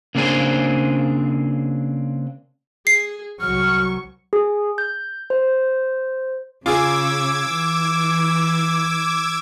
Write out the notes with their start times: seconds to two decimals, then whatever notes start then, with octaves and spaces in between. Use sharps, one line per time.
0.15 C#3 A#3 C4 D4 G#4 C5
2.87 G#4 C7
3.41 C2 F#3 C#6 F6
4.33 G#4
4.78 G6
5.30 C5
6.66 C#3 F4 G#4 D6 E6 G#6
7.52 E3